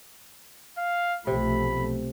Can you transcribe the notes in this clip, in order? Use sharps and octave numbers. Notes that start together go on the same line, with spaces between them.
F5
B1 C3 F3 A3 B5